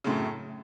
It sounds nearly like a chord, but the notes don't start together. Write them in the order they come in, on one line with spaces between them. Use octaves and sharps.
C#3 A2 F#2